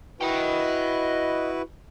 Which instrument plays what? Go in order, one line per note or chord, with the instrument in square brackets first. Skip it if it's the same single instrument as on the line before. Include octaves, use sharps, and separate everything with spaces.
[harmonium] E4 F#4 B4 [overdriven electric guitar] D#5 G5